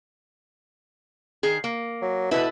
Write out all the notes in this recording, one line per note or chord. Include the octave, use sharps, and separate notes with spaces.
D#3 G#4
A#3
F#3
B2 E4 A4 B4